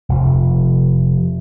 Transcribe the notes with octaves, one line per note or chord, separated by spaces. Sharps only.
F1